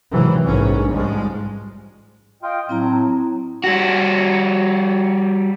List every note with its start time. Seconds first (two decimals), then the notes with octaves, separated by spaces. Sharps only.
0.12 G#1 G#2 C3 E3 F#3
0.44 A#1 G#2 G#3 C#4
0.91 A1 G#2 F3 G3 G#3
2.43 F4 D#5 G5
2.69 A2 F#3 C4 E4 A#5
3.64 G3 F#4